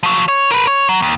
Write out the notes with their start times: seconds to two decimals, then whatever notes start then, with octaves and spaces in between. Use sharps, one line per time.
0.03 F3 F#3
0.28 C#5
0.51 A#4 B4
0.67 C#5
0.89 F#3
1.02 D#2